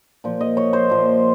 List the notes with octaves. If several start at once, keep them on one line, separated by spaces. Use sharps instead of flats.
A#2 F3
D#5
C#5
C5
A#2 F3